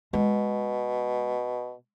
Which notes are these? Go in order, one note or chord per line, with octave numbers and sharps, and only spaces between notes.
B2 G#3